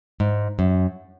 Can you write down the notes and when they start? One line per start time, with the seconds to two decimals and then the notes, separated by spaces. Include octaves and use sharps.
0.20 G#2
0.59 F#2